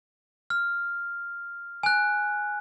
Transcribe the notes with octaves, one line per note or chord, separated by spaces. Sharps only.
F6
G#5 F#6